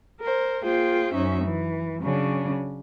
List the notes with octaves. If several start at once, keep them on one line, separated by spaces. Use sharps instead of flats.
A#4 C5
A#3 F4 G#4 C5 G5
F#2 C#4 D#4 E5
E3
C#3 F#3 C#4 D4